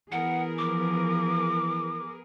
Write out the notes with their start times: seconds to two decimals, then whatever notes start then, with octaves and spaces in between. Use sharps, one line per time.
0.12 E3 B3 G#4 A#4 F#5
0.58 F3 D6